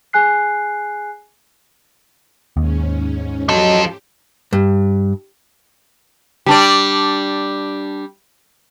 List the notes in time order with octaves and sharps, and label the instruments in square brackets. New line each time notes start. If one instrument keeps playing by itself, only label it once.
[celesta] G#4 G#5 F#6 C7
[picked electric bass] D#2 [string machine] G#2 C#4
[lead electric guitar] F3 A4 [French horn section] F#3 D#5 [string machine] G4
[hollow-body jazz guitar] G2
[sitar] G3 D4 D5